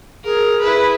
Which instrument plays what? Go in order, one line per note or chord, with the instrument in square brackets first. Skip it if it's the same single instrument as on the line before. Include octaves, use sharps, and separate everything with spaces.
[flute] G#4 [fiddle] A#4
[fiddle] E4 B4 [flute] G#4